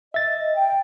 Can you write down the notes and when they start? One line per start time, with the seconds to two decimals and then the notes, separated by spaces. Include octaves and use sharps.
0.14 D#5 E5 A6
0.54 G5